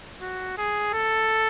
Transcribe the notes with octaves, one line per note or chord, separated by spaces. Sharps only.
F#4
G#4
A4